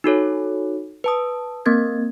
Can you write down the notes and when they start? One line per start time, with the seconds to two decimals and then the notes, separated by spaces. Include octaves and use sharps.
0.04 D#4 F#4 A4 C#5
1.04 B4 A5 D#6
1.65 A#3 C4 A#4 G#6 A6